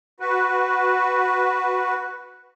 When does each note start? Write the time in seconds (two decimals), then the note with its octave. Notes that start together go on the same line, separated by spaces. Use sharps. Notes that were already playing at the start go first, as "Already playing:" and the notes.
0.20 F#4 B4